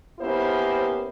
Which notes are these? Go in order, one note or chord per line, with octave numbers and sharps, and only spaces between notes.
A#3 B3 C#4 E4 G4 C5